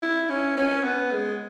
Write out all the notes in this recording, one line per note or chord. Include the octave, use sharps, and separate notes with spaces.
E4
C#4
C#4
B3
G#3